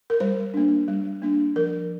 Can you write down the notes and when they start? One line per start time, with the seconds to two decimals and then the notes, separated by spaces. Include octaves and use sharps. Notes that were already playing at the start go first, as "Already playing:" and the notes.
0.10 A#4
0.20 G3 C5
0.54 A#3 D4
0.88 G3
1.22 A#3 D4
1.56 F3 A#4